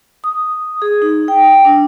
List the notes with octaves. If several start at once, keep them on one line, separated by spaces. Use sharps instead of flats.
D#6
G#4
D#4
G5
D4